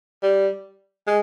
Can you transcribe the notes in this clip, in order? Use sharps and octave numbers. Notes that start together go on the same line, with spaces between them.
G3
G#3